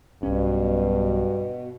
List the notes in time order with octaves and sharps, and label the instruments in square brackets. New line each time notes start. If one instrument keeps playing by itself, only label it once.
[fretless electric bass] B1 C#4 [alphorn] G2 [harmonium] B2